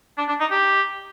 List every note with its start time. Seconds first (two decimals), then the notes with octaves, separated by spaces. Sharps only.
0.18 D4
0.28 D4
0.40 D#4
0.51 G4